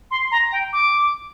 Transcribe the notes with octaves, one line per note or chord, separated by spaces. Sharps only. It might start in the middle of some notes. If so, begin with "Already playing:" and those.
C6
A#5
G5
D6